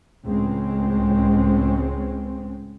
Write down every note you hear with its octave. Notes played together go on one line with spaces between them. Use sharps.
C#2 A2 G#3 C4 C#4